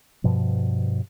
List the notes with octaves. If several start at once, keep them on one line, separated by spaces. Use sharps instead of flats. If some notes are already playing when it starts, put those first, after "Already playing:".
G2 B2 F3